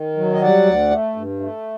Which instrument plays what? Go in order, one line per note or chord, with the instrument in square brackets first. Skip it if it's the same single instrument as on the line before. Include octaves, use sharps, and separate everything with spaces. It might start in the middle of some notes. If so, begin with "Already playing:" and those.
Already playing: [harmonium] D#3
F#3
D#5
G3 D5 F#5
D2
A3
G2
A3